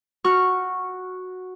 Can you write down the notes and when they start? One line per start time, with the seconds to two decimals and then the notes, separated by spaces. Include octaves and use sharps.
0.24 F#4 C#6 F6